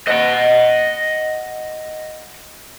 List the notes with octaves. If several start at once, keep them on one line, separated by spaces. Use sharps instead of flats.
D#5 F#5